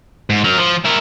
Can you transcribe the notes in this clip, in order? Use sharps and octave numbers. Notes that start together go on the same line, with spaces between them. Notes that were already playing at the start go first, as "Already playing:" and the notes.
G#2
F#3 A#4
F3
E4 A#4